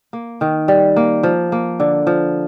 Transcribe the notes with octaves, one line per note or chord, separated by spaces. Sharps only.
A#3
D#3
G3
A#3
F3
A#3
D3
F3